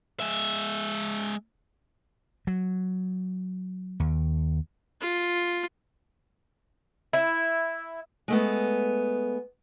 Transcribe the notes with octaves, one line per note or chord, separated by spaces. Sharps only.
G#3 E5
F#3
D#2
F4
E4
G#3 A3 B3